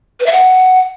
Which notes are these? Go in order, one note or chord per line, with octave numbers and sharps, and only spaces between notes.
B4
E5
F#5